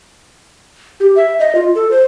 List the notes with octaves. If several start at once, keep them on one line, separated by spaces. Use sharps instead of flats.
G4
E5
D#5
F4
A4
C5